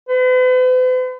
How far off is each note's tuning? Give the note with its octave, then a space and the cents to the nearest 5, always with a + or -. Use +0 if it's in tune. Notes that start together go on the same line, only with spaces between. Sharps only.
B4 +45